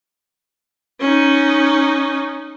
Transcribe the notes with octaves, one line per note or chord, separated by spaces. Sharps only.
C#4 D#4